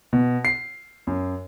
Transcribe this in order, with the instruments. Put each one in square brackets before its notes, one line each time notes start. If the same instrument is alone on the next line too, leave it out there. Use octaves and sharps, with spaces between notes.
[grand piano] B2
C7
F#2